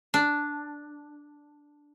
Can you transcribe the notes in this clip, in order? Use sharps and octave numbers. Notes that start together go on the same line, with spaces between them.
D4